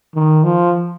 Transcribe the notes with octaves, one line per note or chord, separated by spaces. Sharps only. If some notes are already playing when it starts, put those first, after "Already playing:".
D#3
F3